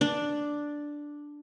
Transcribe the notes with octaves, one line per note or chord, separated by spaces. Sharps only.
D4